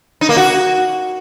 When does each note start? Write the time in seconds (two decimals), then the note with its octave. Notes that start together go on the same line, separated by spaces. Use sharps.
0.21 D#4
0.29 A#3
0.37 F#4